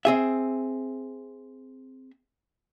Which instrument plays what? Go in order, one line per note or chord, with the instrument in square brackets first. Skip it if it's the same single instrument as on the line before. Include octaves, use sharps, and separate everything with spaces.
[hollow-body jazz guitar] C4 G#4 E5